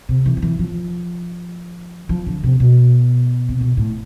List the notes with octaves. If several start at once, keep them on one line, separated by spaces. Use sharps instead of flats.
C3
E3
F3
E3
F3
F3
D3
C3
B2
C3
B2
A2